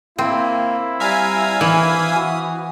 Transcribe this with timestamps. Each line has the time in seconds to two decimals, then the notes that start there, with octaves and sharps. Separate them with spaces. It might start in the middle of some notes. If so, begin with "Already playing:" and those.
0.18 A#3 C4 E4
1.00 G3 E5 F5 G#5 A#5
1.61 E3 D#6
2.15 F#4